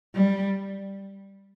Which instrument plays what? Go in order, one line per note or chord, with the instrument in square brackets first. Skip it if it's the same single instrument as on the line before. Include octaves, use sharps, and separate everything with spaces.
[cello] G3